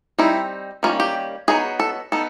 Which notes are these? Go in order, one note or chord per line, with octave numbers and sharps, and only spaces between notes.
G3 C4 D#4 E4
D#3 G3 A#3 C#4 F4
G4
F#3 B3 D#4 G#4
A4
B3 D#4 A4